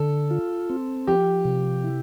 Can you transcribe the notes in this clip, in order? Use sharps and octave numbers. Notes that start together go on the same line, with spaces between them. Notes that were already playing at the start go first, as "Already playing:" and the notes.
Already playing: D3 A4
F4
C4
F3 G4
C3
E4